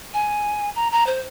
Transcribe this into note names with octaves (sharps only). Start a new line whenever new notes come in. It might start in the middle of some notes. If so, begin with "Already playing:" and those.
G#5
A#5
A#5
C5